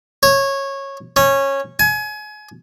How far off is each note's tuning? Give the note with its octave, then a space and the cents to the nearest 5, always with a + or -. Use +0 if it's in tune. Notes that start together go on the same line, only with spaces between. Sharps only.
C#5 -15
C#4 -15
G#5 +30